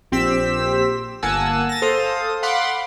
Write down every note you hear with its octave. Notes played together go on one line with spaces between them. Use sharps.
A#1 C4 G4 E6 B6
G1 A#3 F#5 G#5 A5 E6
A6 A#6
A4 C5 F5 D#6
F5 F#5 B5 C6 D6